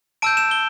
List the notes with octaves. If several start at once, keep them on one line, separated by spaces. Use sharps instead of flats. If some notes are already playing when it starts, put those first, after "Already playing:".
A5 E6 G6 D7
E7
G7